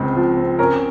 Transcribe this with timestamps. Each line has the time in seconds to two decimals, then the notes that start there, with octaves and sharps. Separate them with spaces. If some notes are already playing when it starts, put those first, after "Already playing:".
Already playing: C#2 G#3 C4
0.16 F3
0.37 C4
0.59 C#4 A#4